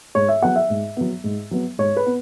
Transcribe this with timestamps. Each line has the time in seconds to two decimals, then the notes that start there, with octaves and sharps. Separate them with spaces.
0.15 G#2 C#5
0.28 E5
0.42 F#3 B3 F#5
0.56 E5
0.70 G#2
0.97 F#3 B3
1.24 G#2
1.51 F#3 B3
1.78 G#2 C#5
1.97 B4
2.06 B3